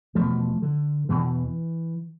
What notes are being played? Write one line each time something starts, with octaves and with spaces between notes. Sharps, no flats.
E2 B2 F3 A3
D3
E2 B2 E3